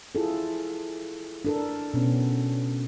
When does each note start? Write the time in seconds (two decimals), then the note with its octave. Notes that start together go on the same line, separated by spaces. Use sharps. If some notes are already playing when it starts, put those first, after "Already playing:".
0.15 E4 F4 G#4 A4
1.45 D4 A4 A#4
1.94 B2 B3 C#4 D4